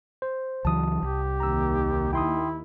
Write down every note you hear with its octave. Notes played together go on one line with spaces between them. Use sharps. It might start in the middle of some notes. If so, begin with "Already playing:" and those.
C5
C#2 E3 F#3 A5 D#6
C2 G4
D#2 A#5 E6
E4 G5 C6 D#6